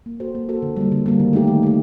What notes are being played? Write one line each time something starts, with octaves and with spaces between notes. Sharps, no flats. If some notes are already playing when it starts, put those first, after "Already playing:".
A#3
F#4 A4 C5
A#3
F#4 A4 C5
D3
G3 A#3
D3
G3 A#3
D#3
A3 D#4 G4
D#3
A3 D#4 G4